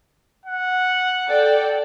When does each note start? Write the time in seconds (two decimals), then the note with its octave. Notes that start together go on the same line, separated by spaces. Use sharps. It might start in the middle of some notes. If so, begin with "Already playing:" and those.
0.46 F#5
1.27 A4 D5 G5